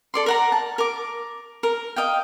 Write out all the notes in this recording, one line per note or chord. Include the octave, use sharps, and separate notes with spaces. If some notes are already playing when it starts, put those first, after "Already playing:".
A4 D5 C6
A#4 F#5 A#5
A5
A#4 D6
A#4
D#5 F5 G5